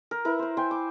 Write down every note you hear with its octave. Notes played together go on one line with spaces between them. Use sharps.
A#4
E4 A#4 B4
B4 C5
C5 G5 G#5
D6